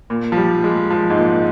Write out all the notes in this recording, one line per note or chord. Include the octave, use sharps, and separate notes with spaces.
A#2
F3
G3
G#3
F3
G#2
A#2